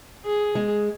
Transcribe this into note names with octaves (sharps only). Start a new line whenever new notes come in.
G#4
G#3